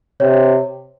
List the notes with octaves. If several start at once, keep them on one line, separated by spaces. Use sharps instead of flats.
C3 C#5